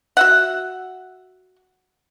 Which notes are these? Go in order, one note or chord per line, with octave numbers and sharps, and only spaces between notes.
F#4 E5 F#5